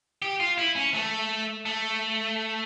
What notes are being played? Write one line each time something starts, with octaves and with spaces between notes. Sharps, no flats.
G4
F4
E4
C#4
A3
A3